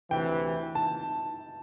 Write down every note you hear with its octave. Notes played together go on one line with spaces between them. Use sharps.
D2 C3 E3 G5
A5